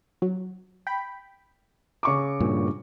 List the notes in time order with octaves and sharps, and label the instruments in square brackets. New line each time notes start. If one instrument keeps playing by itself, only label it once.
[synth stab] F#3
G5 B5
[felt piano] C#3 C#6 D6
[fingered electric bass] G2 A#2